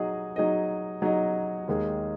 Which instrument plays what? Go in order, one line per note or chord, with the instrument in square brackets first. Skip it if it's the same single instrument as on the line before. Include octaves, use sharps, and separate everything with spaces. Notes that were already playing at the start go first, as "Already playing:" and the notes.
Already playing: [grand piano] F#3 D#4 G#4 D#5
F#3 D#4 G#4 D#5
F#3 D#4 G#4 D#5
D#2 D#3 G#3 D#4 G#4